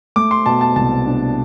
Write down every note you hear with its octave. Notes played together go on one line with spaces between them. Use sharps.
A3 D6
C6
B2 A5
A5
C2 A5
D4